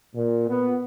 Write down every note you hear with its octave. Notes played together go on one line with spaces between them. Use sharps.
A#2
B3